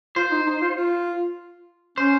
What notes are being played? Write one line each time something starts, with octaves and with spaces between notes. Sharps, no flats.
F4 C5
D#4
D#4
F4
F4
C#4 C5